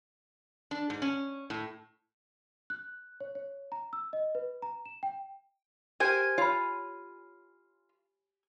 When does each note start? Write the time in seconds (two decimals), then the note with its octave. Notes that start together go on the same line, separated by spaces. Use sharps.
0.71 D4
0.90 G#2
1.02 C#4
1.50 A2
2.70 F#6
3.20 C#5
3.35 C#5
3.72 A#5
3.93 E6
4.13 D#5
4.35 B4
4.62 A#5
4.85 E7
5.03 G5
6.00 G4 A#4 C5 G#5
6.38 F4 C#5 B5